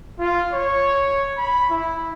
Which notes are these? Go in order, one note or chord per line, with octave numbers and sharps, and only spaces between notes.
F4
C#5
B5
E4